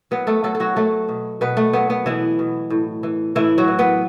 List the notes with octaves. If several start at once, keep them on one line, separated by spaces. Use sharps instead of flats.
F#3 B3 B4
A3 A4
F#3 A3 A4
A4
F#3 F#4
F#3 A3 A4
B2
B2 B3 B4
A3
F#3 B3
B3
B2 E3 E4
B2
A2
E3
A2 E3 E4
F#3 F#4
E3
B3 B4